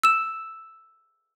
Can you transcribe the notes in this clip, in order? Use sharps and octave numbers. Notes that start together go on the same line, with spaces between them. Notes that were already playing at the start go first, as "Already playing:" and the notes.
E6 E7